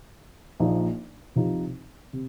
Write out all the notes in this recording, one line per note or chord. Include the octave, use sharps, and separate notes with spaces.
A#1 A#2 F3 D#4
C2 C3 F3 D#4
C3